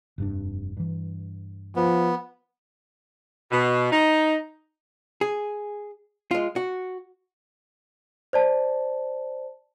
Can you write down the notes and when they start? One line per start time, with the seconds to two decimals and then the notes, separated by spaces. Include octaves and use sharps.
0.18 F1 G2 D4
0.77 G2 E3
1.76 F3 B3
3.52 B2
3.92 D#4
5.21 G#4
6.31 G#3 F4
6.56 F#4
8.33 C5 D5 A5